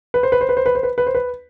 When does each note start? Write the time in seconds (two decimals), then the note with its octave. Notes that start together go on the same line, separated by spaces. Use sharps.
0.14 B4
0.23 C5
0.32 B4
0.41 C5
0.49 B4
0.57 C5
0.66 B4
0.75 C5
0.83 B4
0.98 B4
1.07 C5
1.15 B4